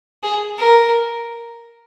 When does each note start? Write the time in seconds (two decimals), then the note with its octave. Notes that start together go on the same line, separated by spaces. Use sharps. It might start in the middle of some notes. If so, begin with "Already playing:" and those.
0.23 G#4
0.58 A#4